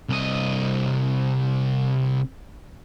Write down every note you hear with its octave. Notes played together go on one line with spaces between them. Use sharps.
C2 D#5